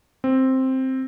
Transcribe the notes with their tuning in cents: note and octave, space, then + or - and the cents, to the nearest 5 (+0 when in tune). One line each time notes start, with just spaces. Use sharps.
C4 +5